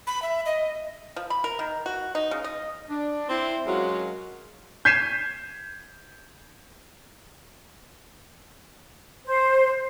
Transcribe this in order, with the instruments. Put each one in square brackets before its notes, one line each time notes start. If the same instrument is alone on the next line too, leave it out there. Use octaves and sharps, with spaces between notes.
[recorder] B5
E5
D#5
[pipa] F3
B5
A#4
D#3
F#4
D#4
C#3
D#5
[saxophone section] D4
C4 E4
F#3 G#3 C#4 F4 F#4 A#4
[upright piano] G6 G#6 B6 C7 D#7 E7
[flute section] C5